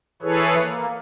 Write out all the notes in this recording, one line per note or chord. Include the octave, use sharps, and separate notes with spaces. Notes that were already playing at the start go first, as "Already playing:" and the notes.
E3 E4 G#4 A4 B4 C#5
A#3